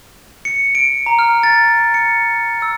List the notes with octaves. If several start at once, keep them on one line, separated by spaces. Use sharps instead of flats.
C#7
D7
A#5
F6
A6
C#7
E6